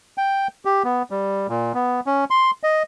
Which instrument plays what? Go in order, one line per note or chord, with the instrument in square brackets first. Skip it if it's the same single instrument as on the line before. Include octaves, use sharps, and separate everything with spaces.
[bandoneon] G5
G4
B3
G3
A#2
B3
C#4
C6
D#5